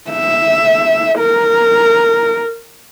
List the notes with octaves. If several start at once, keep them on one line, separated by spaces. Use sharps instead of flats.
E5
A#4